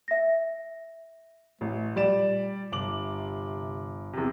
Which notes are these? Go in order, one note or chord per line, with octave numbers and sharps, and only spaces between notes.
E5 A#6
A1 A3
A#2 G3 D5 E7
G1 C3 D6 F#7
E2 C3